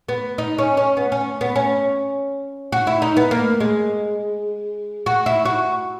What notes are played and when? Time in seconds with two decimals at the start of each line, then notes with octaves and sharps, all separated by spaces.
0.08 B3
0.38 D#4
0.58 C#4
0.77 C#4
0.97 B3
1.12 C#4
1.41 B3
1.56 C#4
2.72 F#4
2.87 E4
3.02 D#4
3.17 B3
3.31 A#3
3.60 G#3
5.06 F#4
5.26 E4
5.45 F#4